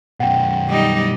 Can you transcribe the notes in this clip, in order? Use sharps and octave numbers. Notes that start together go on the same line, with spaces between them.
F#2 B2 F#5 G5
G3 D#4